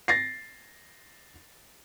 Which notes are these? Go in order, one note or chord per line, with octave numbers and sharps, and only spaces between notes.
A6 A#6 C7